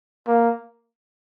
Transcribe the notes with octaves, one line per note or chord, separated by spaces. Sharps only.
A#3